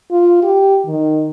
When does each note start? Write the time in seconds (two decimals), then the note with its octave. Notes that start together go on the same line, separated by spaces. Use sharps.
0.11 F4
0.43 G4
0.86 D#3